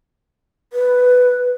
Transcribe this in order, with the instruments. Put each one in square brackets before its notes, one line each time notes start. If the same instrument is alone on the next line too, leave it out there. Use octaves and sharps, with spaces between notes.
[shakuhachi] B4